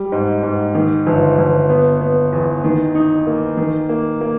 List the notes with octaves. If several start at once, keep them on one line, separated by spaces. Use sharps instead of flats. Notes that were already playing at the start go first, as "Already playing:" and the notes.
Already playing: G3
G#2
G#2
D#3
G1
G1
B3
B3
E2
D#3
D#4
A#3
D#3
A#3
A#3